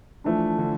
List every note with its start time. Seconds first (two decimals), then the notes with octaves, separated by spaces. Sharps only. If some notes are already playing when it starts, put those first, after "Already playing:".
0.24 E3 F3 A3 D4
0.58 D3